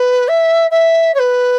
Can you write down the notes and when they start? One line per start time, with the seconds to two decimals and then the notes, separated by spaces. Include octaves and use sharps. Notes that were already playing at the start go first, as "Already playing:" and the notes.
Already playing: B4
0.28 E5
0.71 E5
1.14 C#5
1.19 B4